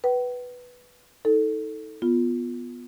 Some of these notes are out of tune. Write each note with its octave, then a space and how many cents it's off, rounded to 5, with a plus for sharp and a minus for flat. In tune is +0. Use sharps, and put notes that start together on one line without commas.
B4 +0 G5 -45
D#4 +35 A4 +0
B3 +0 F4 +0